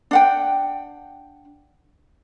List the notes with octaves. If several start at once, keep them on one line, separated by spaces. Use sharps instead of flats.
D4 F#5 G5